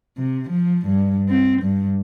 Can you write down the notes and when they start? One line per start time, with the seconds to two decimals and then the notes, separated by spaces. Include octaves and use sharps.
0.17 C3
0.50 F3
0.86 G2
1.29 C4
1.62 G2